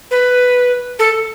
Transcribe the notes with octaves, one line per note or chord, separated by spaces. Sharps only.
B4
A4